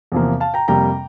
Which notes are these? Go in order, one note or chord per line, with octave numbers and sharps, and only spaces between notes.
E2 C3 F3 A#3
F5 A5
G5 A#5
F2 C3 G3 A#3 G5 A#5